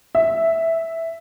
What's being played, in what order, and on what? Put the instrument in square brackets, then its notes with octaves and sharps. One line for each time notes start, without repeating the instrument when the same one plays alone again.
[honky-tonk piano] E5